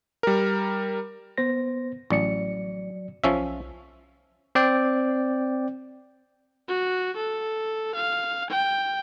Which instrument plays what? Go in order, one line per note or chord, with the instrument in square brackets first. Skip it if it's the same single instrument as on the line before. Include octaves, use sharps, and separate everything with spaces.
[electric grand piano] G3 A#4
[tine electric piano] B3 C5 A#6
[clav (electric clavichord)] A1 [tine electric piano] F#3 D5 C#7
[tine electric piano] B1 [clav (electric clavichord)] F3 C#4 E5
[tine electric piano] C4 D5 G5
[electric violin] F#4
A4
F5
G5